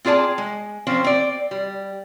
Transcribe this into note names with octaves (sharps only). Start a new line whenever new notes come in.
C4 F4 G#4 D5 A5
G#3
F3 C4 C#4
C4 D5
G3